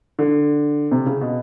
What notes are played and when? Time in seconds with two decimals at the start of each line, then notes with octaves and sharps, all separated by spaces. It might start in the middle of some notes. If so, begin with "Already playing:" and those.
0.19 D3
0.91 C3
1.06 C#3
1.21 B2